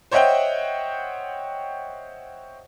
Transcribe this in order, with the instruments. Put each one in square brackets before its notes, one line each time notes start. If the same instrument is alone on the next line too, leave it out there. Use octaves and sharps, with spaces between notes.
[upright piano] C5 C#5 D#5 E5 F#5 G5